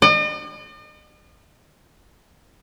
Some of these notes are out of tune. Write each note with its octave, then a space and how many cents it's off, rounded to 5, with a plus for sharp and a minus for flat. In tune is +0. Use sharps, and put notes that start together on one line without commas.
D#5 -45